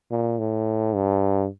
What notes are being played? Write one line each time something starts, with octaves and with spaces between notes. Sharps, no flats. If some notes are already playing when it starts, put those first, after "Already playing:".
A#2
A2
G2